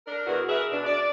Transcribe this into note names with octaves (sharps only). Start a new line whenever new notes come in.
D4 A#4
E2 B2 E4 F#4 A#4
G#4 A#4 B4 E5
B2 D4
D5